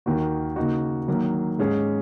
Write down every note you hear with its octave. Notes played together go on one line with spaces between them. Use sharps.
D#2 D#3 A#3 F#4
C#3 A#3 D#4 F#4
D#3 F#3 A#3
G#2 G#3 C#4 G#4